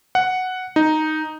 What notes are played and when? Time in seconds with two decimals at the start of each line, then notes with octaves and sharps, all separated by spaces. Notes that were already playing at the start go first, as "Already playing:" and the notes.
0.15 F#5
0.76 D#4